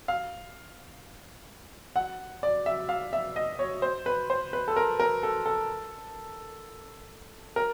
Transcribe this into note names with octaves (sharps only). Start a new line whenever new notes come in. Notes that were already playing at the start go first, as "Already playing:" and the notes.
F5
F#5
D5
E5
F5
E5
D#5
C#5
C5
B4
C5
B4
A4
A#4
A#4
A4
A4
A#4